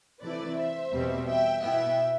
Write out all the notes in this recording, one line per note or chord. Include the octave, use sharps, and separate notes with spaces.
C3 E3 A3 E4 B4 D5
C5 E5
E2 B2 G3 C4
E5 G5
B2 B3 E4 E5 G5